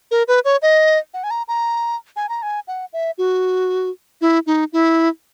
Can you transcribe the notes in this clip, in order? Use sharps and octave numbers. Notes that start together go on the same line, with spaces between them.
A#4
B4
C#5
D#5
F#5
G#5
A#5
A#5
G#5
A#5
G#5
F#5
E5
F#4
E4
D#4
E4